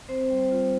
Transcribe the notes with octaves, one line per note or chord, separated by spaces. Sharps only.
C4 C5
G3
F4